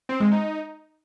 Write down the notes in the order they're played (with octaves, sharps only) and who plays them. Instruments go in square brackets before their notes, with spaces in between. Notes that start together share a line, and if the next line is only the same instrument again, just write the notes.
[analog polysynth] C4
G#3
D#4